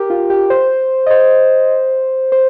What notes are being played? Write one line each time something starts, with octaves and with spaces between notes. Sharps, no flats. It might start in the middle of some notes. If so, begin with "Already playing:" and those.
Already playing: G4 A#4
F4
G4
C5
D#5
C5
C5